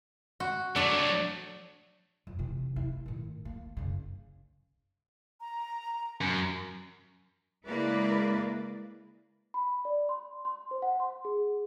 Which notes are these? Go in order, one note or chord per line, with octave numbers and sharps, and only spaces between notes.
F#4
F#3 A3 D4 D5
F2
C3 E3
E4
A2 D#3
D2 A#3
F#1 C#3
A#5
F#2
C#3 G#3 A#3 E4 B4 D5
B5
D5
C6
C6
C5
F#5
C6
G#4